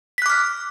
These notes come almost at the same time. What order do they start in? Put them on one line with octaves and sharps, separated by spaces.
B6 F#6 D6 F6